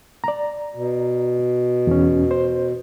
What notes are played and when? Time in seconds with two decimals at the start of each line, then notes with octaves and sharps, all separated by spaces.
0.24 D5 A#5
0.75 B2
1.87 E2 C#4
2.31 C5